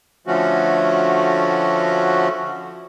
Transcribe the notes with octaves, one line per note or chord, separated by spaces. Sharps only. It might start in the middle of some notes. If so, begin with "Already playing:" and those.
D3 F3 A3 C#4 F#4